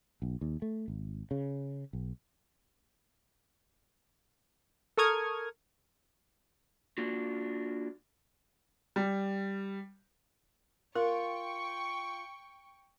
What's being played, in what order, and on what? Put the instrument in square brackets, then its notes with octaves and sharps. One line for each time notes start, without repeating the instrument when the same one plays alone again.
[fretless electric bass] B1
D#2
A3
G#1
C#3
B1
[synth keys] A4 A#4 C#6 D#6 F6 G#6
[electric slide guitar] A#3 D4 F4 F#4
[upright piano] G3
[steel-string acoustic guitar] F4 [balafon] A#4 [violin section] G5 C#6